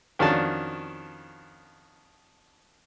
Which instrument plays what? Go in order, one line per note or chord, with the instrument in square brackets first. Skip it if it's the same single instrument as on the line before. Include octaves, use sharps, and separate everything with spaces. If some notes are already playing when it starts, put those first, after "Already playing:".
[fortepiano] F2 D#3 C#4 D4 F#4 A5